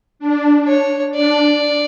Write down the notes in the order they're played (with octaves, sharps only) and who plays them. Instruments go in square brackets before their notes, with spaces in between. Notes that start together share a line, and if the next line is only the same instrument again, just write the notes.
[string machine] D4
[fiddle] C#5
[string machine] D4 [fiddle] D5